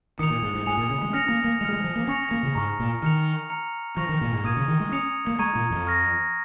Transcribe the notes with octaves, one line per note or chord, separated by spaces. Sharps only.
D#3 D#6 C#7 F7
A#2
G#2
G#2
G#2 G#5 D#6 C#7 F7
A#2
C#3
G#3
C#4 F6 A#6 C#7 F7
A#3
A#3
G#3 F6 C#7 F7
G#3
F3
A#3
C#4 G#5 C#6 A#6 C#7 F7
A#3
C#3
G#2 A#5 C#6 F6
A#2
D#3 F6 C#7 F7
A#5 F6 C#7 F7
F3 C#6 F6 A#6 F7
D#3
A#2
G#2
A#2 D#6 G#6 D#7
C#3
D#3
G#3
C#4 D#6 C#7 F7
A#3
G#3 A#5 C#6 G#6 D#7
A#2
F2
C#6 F6 A#6